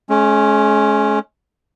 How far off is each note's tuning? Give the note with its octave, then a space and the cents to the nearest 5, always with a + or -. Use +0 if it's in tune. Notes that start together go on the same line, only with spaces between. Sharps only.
G#3 +40 C#4 +0